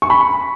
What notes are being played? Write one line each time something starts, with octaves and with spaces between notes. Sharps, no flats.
C#6
B5